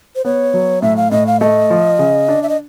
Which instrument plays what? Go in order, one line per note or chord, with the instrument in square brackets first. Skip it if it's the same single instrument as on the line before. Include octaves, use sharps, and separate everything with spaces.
[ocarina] C5
[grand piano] B3 [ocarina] C#5
[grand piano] F#3
[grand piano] A2 [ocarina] E5
[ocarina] F5
[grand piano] A2 [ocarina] D#5
[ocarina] F5
[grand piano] A3 [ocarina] D#5
[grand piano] F3
C#3
D4
[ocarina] E5
D#5